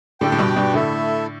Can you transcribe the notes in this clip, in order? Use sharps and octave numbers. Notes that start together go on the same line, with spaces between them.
A2 D3 D4 G4 D5 G5
A2
G2 B2
G2 B2
A2 D3 A3 E4 A4 E5